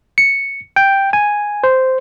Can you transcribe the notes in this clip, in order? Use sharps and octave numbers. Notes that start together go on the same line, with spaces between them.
C#7
G5
G#5
C5